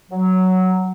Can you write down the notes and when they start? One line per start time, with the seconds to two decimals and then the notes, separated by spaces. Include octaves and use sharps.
0.11 F#3